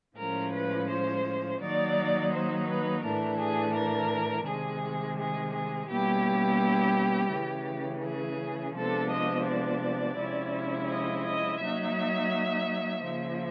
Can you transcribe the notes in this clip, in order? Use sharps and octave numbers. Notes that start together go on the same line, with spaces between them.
A2 F3 G#3 C#4 A#4
B4
C5
D#3 F#3 A#3 D#4 D5
C5
B4
A2 E3 A3 D4 A#4
G#4
A#4
C3 D#3 G#3 G#4
G#4
G#4
B2 G3 A#3 C#4 E4 G4
C#3 E3 A3 C#4
G#4
C3 F3 G#3 B3 D4 A4
D#5
D5
C3 F3 G#3 C#4 E4
D#5
D#5
F#3 A#3 D#4 E5
C#3 F3 A#3